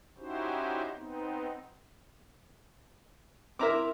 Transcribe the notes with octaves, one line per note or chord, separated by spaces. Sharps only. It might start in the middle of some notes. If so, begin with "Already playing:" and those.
C#4 D#4 E4 F#4 G4 C5
B3 C4 D#4
C4 E4 A#4 E5 A#5 D6